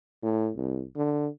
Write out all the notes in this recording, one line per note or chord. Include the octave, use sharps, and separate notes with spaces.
A2
C2
D3